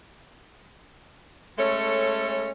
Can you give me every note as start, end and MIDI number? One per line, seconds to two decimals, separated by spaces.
1.58 2.50 56
1.58 2.50 57
1.58 2.50 61
1.58 2.50 69
1.58 2.50 73